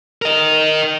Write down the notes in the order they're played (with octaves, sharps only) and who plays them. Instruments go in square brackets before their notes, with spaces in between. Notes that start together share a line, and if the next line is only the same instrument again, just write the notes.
[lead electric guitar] A#4 D#5